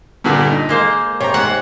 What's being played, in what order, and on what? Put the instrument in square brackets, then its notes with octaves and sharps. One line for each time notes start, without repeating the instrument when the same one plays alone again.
[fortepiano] G2 A#2 D3
D#4
[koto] G#3 A#3 C5
[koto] C3 [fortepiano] C#5 A#5
[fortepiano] G#2 [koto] F#5